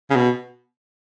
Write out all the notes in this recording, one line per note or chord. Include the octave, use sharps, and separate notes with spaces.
C#3
B2